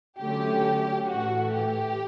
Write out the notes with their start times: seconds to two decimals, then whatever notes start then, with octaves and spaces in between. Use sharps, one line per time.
0.19 D3 F#3 A3 C#4 G4
1.08 A2 E3 A3 F#4
1.52 G4